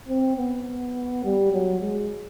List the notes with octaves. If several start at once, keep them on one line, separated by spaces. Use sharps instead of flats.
C4
B3
G3
F#3
G#3